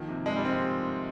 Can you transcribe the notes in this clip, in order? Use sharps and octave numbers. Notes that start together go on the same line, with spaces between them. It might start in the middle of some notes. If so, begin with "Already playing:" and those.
Already playing: D#3 F3 A#3
C3
C3 G#3
G3
F3 C4